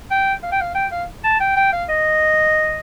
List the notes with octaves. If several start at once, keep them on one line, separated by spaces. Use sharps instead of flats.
G5
F5
G5
F5
G5
F5
A5
G5
G5
F5
D#5